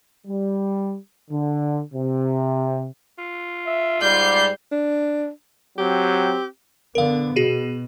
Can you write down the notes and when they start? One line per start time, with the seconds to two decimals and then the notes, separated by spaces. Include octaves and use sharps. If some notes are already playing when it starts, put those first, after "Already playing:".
0.27 G3
1.31 D3
1.94 C3
3.18 F4
3.66 E5
4.02 G#2 G3 D5 G6 C7
4.72 D4
5.78 F#3 C4 G4
6.95 D3 B3 A#4 F5
7.36 B2 F#4 G#4 D#7